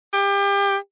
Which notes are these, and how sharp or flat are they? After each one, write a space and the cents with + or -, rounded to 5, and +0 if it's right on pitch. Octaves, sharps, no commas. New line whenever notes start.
G4 +30